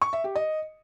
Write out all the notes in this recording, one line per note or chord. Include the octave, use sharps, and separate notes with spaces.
C#6
E5
G4
D#5